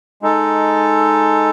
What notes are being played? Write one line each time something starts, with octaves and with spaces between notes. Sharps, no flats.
G#3 D#4 A4